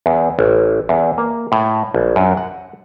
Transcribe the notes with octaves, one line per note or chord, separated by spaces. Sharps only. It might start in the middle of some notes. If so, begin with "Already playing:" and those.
E2
A1
E2
A#3
A2
A#1
F#2
F#5